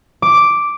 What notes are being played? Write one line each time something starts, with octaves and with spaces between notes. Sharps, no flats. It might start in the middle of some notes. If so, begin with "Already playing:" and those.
D6